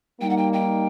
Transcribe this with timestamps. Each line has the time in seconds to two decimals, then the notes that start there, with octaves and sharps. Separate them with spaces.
0.21 G3 A#3 D#4 G5
0.29 F#5
0.37 G5
0.53 G5